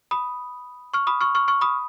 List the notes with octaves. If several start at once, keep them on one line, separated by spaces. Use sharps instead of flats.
B5 D#6
C#6 F6
B5 D#6
C#6 F6
C#6 F6
C#6 F6
B5 D#6